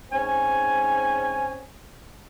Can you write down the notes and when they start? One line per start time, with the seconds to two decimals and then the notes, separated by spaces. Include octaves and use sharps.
0.12 G#2 C4 C#4 G#5